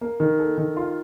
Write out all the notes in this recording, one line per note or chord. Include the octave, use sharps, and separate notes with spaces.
A#3
D#3
A4
D#3
F4